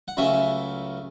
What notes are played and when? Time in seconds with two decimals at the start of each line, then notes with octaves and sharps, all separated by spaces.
0.08 F#5
0.17 C#2 C#3 F#3 A3 E5